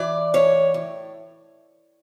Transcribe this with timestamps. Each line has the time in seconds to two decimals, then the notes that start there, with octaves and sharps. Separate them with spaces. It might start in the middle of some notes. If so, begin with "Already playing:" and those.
Already playing: E3 D5
0.34 A2 C#5
0.74 A2